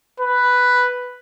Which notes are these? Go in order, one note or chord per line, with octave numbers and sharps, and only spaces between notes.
B4